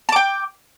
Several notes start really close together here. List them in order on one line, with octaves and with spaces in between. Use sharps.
A5 D6 G5